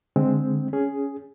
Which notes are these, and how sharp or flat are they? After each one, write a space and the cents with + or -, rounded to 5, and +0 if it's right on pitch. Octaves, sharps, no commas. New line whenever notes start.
D3 +0 G#3 +0 C4 +0
C#4 +10 G#4 +0